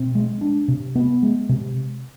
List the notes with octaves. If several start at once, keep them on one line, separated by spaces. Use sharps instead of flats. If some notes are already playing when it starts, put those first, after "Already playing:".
Already playing: B2 C4
G#3
D4
C3
B3
G#3
C3